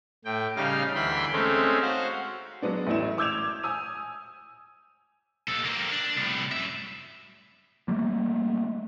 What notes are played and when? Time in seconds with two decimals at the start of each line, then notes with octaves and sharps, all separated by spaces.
0.25 A2 G5
0.56 C#3 G3 D#4 F5 F6
0.95 D2 E3 G5 B5 C6
1.33 G#3 A3 C4 C#4 D#4
1.82 F#4 C5 F5
2.62 F#3 G#3 B3 D4
2.87 A1 E3 E4 E7
3.18 D6 E6 G6 G#6 E7 F7
3.63 G#5 D#6 E6 D#7
5.49 D#2 A4
5.65 A#3 C4
5.91 D4
6.17 C2 A2
6.52 F#2 E5
7.88 G3 A3 A#3